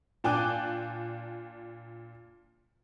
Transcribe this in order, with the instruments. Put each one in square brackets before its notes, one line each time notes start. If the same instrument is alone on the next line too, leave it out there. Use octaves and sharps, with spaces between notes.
[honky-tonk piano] A#2 D4 G5 G#5 D6 F#6